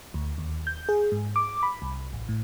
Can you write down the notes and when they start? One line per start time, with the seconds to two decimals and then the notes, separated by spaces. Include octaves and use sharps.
0.14 D2
0.38 D#2
0.67 G6
0.89 G#4
1.12 G#2
1.36 D6
1.63 B5
1.82 C2
2.13 A1
2.29 A2